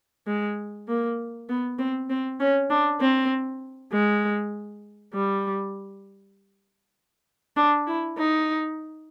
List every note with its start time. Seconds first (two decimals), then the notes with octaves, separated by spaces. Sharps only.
0.27 G#3
0.88 A#3
1.49 B3
1.79 C4
2.10 C4
2.40 C#4
2.70 D4
3.01 C4
3.93 G#3
5.14 G3
7.57 D4
7.87 E4
8.18 D#4